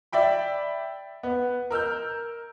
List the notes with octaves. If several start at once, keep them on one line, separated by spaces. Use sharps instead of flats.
D5 E5 G5 B5
B3
A#4 E6 F6 G6